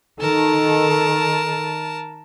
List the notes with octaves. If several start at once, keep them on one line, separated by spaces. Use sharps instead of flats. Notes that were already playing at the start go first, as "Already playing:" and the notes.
D#3 A4 A#4 A5